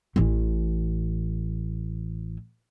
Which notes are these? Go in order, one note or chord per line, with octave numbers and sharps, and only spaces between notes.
A1 E3